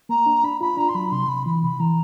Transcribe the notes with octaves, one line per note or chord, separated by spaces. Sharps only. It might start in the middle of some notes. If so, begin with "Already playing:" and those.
A#3 A#5
D4
D4 B5
F4 B5
D4 A#5
C6
F#3 B5
C3 C6
C3 B5
E3 B5
C3 B5
E3 A#5